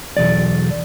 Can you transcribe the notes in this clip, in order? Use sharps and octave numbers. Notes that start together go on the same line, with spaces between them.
B1 E2 D5